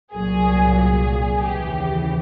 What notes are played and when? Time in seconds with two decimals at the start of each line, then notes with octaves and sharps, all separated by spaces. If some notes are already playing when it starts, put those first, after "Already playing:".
0.13 C2 A#2 F#3 G#4
0.79 G#4
1.43 D#2 C#3 E3 G4